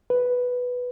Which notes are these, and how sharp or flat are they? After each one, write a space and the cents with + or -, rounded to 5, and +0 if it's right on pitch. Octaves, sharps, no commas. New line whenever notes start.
B4 +0